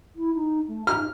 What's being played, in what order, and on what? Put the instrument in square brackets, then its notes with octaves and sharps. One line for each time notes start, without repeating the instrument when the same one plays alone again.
[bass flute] E4
D#4
A3
[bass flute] D#4 [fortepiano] F6